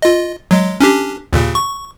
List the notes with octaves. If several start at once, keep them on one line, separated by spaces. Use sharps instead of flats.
F4 D#5
F#3 G#3
C#4 D4 G4
D#2 A#2 C#3
C#6